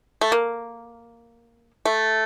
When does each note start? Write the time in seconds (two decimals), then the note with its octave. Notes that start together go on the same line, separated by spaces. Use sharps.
0.21 A3
0.32 A#3
1.85 A3